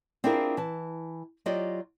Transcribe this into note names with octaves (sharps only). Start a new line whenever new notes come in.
C4 D4 E4 F4 G#4 A#4
E3 A5
F#3 F4 G4 D5 D#5